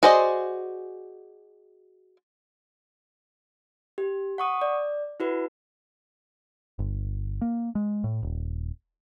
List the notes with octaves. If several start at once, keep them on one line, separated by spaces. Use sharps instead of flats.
F#4 G#4 C5 D5 D#5
G4
F#5 C#6 D#6
D5
E4 F#4 B4
G1
A#3
G#3
A2
D#1